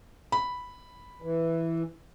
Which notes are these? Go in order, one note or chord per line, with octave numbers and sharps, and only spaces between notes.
B5
E3